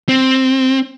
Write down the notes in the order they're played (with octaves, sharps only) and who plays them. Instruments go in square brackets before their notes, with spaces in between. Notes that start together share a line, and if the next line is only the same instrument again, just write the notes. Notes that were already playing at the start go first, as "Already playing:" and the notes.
[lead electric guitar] C4